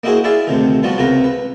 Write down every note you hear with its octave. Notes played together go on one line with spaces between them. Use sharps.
A#3 D#4 E4 F#4 G#4 C5
E4 F4 G#4 D5 E5 F5
D2 C3 D#3
F3 G3 B3 F4 F#4
C#2 C3 F4 A#4 B4 A#5
B4